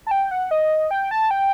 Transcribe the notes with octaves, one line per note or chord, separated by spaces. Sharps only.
A5
G5
F#5
D#5
G5
A5
G5